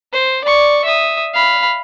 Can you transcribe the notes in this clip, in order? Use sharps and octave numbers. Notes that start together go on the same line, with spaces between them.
C5
D5 C#6
E5 D#6
F5 B5